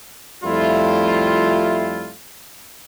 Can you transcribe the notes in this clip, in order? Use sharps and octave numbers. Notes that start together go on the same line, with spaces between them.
F2 G3 A3 E4 F4